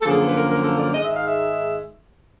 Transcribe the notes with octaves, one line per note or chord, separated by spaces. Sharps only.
A4
F#2 D3 F3 A#3 G#4
A4
B4
A#4
A#4
A4
D5
G#2 D#3 G#3 D#5
E5
F5
E5